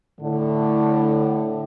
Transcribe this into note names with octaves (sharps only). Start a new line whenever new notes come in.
A2 D3